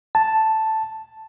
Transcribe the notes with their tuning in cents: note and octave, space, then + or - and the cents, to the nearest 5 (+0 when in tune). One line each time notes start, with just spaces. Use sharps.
A5 +0